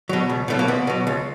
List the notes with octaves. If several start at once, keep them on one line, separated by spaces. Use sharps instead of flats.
B2 F#3
C#2
B2 F#3 A3
A#3
C#2 B3
B2 F#3
C#2